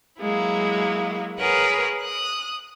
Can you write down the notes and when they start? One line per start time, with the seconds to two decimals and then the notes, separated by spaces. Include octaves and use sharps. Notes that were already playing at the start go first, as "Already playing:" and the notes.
0.21 F#3 G#3 A#3 E4
1.39 G#4 A#4 B4 C#5 F#5
2.01 D#6 F#6